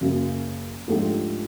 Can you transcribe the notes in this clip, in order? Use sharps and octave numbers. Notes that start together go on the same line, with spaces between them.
F#2 C#3 F#3 A#3 C#4
G#2 F3 A3 D4 G4